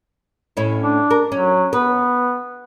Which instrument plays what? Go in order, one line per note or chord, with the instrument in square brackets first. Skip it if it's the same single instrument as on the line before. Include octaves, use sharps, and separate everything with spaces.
[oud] A2 C#4 E4
[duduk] D4
[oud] A#4
[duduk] F#3 [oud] C#4
[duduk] B3 [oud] B4